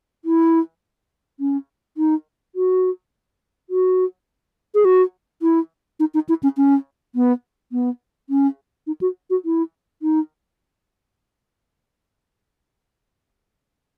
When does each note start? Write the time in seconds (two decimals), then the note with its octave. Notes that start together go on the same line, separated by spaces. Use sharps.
0.25 E4
1.40 C#4
1.97 D#4
2.55 F#4
3.70 F#4
4.75 G#4
4.85 F#4
5.42 E4
6.00 D#4
6.14 D#4
6.29 E4
6.43 C#4
6.57 C#4
7.15 B3
7.72 B3
8.29 C#4
8.87 D#4
9.01 F#4
9.30 F#4
9.45 E4
10.02 D#4